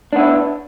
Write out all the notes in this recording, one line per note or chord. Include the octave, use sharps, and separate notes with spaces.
B3 D4 E4